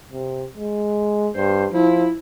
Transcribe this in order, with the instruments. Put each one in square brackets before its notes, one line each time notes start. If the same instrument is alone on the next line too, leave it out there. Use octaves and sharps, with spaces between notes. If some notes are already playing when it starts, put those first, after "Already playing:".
[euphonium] C3
G#3
[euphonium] G2 [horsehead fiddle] C5
[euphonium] F3 [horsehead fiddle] E4